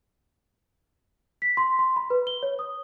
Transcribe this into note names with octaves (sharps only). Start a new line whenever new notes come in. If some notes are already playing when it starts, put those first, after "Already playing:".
B6
C6
C6
B5
B4
G7
C#5
D#6